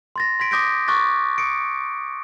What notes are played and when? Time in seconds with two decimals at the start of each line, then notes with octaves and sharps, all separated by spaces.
0.16 C6 A6 A#6
0.40 C6 G#6 B6 D7
0.51 D6 D#6 G6 A#6 B6 D7
0.88 C#6 D6 F#6 A6 B6
1.38 D#6 C#7 D7